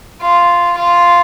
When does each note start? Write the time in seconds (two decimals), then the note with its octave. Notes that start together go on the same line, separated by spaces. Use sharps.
0.21 F4
0.78 F4